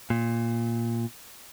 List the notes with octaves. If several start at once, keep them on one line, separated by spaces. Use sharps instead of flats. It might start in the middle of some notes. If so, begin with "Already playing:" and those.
A#2